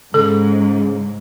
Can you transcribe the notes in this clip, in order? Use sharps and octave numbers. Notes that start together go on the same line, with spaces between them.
G#2 C#3 A4